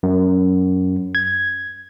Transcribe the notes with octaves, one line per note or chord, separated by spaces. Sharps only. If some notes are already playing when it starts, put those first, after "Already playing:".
F#2
G#6